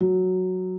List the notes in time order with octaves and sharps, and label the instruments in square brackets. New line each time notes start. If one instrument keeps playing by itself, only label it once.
[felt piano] F#3